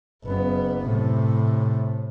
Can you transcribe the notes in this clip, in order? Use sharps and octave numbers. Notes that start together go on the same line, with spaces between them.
F#1 B3
A2 C3